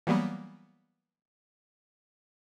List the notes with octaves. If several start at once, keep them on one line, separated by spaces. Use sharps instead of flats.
E3 F#3 G3 A#3 B3